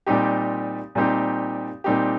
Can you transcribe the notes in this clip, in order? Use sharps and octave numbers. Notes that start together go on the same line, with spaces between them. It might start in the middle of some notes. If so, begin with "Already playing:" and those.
A#2 G3 C4 D#4 G4
A#2 G3 C4 D#4 G4
A#2 G3 C4 D#4 G4